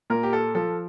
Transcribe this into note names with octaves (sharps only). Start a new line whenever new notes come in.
A#2 A#4
G4
A4
F3 A4